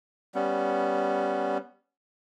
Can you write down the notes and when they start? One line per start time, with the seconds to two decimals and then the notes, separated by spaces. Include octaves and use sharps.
0.35 G3 B3 C#4